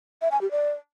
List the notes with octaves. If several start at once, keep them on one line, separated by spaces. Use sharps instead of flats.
E5
G#5
G4
D5